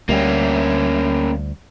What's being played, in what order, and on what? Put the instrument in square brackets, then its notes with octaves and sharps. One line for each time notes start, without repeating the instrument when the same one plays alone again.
[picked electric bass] D2 G3 [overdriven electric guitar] A#3 C#4